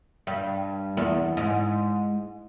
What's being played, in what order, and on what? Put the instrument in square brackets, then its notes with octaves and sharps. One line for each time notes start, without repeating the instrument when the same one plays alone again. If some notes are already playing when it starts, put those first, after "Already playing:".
[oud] G2
E2
G#2